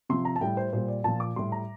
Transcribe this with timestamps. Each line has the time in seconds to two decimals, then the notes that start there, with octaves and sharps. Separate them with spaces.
0.09 C3 F3 C6
0.25 A#5
0.36 A5
0.41 A2 G3 G5
0.57 C5
0.72 A#2 G3 C5
0.88 D5
1.04 A#2 F3 A5
1.20 D6
1.36 A2 G3 C6
1.52 A#5